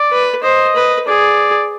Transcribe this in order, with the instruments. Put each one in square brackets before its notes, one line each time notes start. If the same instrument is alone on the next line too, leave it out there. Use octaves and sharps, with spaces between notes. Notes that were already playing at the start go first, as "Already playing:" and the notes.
Already playing: [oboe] D5
[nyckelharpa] B4
[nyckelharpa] C5 [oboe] D#5
[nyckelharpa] B4
[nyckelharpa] G#4 [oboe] D5